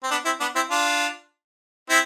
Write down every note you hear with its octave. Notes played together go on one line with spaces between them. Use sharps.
C4
B3 D4
C4 E4
B3 D4
C4 E4
D4 F4
C4 E4